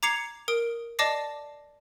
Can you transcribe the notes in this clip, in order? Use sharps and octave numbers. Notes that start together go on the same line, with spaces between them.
A#5 D6 G#6 C7 C#7 F7
A#4 D#6 D7
D5 D#5 A5 D6 A#6 C7